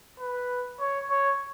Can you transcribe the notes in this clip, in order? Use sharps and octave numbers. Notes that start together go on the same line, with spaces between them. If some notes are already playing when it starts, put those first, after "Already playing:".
B4
C#5
C#5